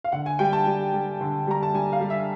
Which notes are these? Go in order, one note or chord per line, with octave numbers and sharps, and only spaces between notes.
F5
D3 F#5
G#5
G3 G5
A5
G3
G3
D3
G3 A#5
A5
G3 G#5
F5
G3
E5